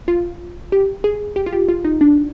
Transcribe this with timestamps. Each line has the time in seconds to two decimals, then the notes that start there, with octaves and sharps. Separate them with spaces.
0.08 F4
0.72 G4
1.04 G#4
1.36 G4
1.46 F4
1.53 G4
1.68 F4
1.84 D#4
2.01 D4